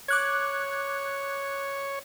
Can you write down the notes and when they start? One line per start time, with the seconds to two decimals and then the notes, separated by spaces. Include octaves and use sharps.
0.08 C#5 D6 F#6 G#6